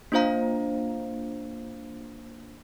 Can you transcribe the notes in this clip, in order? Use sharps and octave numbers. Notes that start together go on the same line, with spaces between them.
A#3 D4 F4 C5 F5 A#5